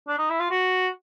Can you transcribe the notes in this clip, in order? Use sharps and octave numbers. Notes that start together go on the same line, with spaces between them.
D4
D#4
E4
F4
F#4